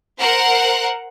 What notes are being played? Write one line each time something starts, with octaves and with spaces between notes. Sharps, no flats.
A#4 C5 F#5